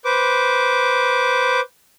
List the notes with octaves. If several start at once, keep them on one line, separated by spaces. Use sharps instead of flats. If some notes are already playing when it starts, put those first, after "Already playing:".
B4 C5 D6